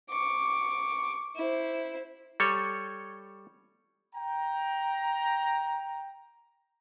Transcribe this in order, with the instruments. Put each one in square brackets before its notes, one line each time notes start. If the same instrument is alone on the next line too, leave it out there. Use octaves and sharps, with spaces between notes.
[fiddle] C#6 D6
E4 C5
[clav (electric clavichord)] G3 A4 C#5 [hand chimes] C#6 G#6 C#7
[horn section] G5 A#5